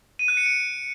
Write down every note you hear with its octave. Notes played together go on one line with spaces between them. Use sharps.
D#7
F#6
C#7
D7